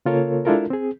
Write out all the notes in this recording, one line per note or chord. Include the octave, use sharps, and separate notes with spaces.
C#3 A#3 F4 A4 A#4 C#5
G#3 D4 E4 F4 A4 A#4
C4 G#4